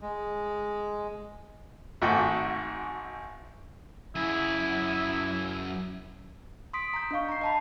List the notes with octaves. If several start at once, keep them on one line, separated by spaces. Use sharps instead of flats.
G#3
G#1 G#2 A3 F#4 G5
F#2 E4 G#4
C6 D#6 B6 D7
A#5 G6
D4 D#5 F5 C#6
A#5 C7
D#5 A5 B5